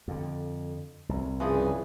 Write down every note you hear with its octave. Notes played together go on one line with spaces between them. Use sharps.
F2 D3
C2
G2 C#3 E3 F3 G#4